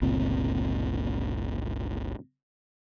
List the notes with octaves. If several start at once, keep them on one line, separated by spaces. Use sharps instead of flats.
G1 C#2 A#2 C4